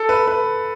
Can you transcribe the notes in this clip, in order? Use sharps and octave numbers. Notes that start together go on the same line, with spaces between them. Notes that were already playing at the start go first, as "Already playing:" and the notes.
Already playing: A4
B4
B4